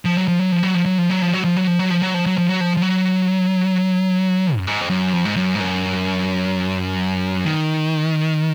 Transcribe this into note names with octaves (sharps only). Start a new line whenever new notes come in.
F3
F#3
F3
F#3
F3
F#3
F3
F#3
F3
F#3
F3
F#3
F3
F#3
F3
F#3
F3
F#3
F3
F#3
F3
F#3
F3
F3
F#3
F#2
G#2
F2
F#2
F2
G#2
F#2
G#2
F#2
D#3